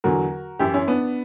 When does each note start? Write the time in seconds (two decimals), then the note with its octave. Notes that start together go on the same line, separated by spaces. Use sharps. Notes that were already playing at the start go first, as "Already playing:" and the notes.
0.04 E2 D3 F#3 F#4 A#4
0.59 F#2 E3 E4 G4
0.74 C#4 E4
0.87 B3 D4